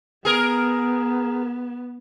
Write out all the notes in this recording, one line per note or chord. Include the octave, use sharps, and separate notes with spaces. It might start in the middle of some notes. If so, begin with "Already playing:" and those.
B3 G#4 A#4